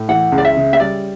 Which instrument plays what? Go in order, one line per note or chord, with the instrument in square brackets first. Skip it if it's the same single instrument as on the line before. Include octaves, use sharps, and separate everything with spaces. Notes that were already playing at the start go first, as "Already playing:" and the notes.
Already playing: [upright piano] A2
[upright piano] E3 [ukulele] F#5
[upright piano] C#2
[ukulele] D5
E5
[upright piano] C#3
[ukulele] E5
[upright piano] G3 [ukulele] D5